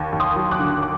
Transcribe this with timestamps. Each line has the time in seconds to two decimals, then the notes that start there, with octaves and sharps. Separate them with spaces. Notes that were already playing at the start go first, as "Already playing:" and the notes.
Already playing: D#2
0.12 D#2
0.20 C6 D#6
0.36 F#3
0.51 D6 F#6
0.59 D3
0.82 D6